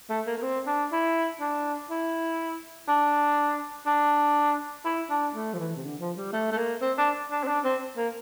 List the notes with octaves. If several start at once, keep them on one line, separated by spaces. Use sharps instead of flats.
A3
A#3
A#3
C4
D4
E4
D4
E4
D4
D4
E4
D4
A3
F3
E3
C3
D3
F3
G3
A3
A3
A#3
C4
D4
D4
C4
D4
C4
A#3